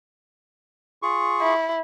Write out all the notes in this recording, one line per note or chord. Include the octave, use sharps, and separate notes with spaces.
F4 G#4 C#6
E4